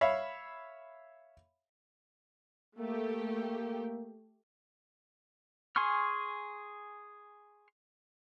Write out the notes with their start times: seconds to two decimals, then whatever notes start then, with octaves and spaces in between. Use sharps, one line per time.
0.01 C#5 E5 F5 B5
2.78 A3 A#3 G4
5.76 G#4 G#5 C6 C#6 F6